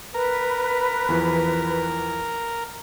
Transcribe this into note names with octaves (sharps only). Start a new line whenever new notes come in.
A#4 B4
E2 E3 F3